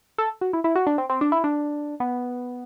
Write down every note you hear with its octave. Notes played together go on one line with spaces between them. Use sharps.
A4
F#4
E4
E4
F#4
D4
C4
C4
D4
E4
D4
B3